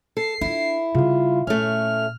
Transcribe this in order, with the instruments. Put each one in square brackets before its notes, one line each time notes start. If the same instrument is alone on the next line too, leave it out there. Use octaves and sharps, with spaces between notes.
[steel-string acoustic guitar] A4 [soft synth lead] C7
[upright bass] D4 F4 [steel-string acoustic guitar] E4
[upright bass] C#3 G3 [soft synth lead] F4
[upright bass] A#2 [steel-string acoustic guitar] A3 C#4 [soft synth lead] F6